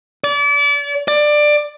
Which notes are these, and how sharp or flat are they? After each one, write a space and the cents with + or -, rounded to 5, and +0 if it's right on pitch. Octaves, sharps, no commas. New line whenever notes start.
D5 -35
D5 +15